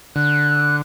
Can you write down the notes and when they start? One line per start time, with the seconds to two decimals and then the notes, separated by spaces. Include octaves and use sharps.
0.16 D3 F#6